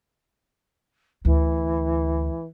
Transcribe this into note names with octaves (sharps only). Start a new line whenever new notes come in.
D2 E3